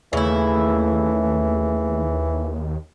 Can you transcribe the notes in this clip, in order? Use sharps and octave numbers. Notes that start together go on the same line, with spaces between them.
D#2 C#3 E3 A3 E4